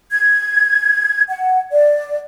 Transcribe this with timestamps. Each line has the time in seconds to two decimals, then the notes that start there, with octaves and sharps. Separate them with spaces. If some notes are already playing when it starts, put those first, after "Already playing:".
0.11 G#6
1.29 F#5
1.71 D5